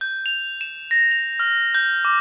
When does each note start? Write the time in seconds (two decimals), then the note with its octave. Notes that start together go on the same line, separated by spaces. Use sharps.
0.01 G6
0.26 F7
0.61 E7
0.91 A#6
1.11 F7
1.40 F6
1.74 G6
2.05 D6